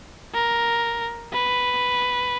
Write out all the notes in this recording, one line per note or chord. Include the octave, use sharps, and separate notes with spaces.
A#4
B4